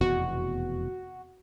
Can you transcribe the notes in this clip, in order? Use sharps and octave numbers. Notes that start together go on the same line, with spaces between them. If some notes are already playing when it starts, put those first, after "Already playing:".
F1 E2 B2 F#4